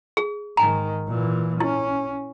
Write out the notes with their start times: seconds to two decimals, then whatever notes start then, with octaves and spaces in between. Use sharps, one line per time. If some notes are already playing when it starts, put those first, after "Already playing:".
0.17 G#4
0.57 G#2 D#3 G#5 A#5
1.09 A#2 E3
1.60 C#4 E4